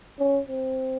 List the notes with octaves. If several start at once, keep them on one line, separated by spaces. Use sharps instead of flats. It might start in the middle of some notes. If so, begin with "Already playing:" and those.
C#4
C4